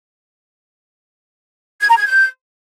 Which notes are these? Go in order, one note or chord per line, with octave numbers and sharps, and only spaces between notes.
G#6
A#5
G#6
G6